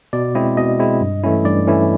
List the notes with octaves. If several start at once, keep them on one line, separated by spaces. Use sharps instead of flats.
B2 D5
G#3 C4 E4 D#5
B2 D#5
G#3 C4 E4
G2
E3 A3 C#4 E4
G2 D5
E3 A3 C#4 E4